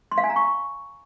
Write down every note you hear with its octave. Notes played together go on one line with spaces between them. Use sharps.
C6
F5
G#5
A#5
C#6